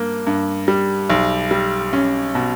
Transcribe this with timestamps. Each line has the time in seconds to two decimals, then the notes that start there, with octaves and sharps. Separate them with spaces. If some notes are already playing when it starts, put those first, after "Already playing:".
Already playing: G2 A#3
0.27 G2
0.68 G3
1.10 B1
1.51 G3
1.93 C#4
2.35 B2